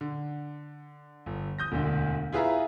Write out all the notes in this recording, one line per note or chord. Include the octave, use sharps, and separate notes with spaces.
D3
G1
D#6 G6 A#6
E1 D2 D3
E4 F4 G#4 B4 E5 A#5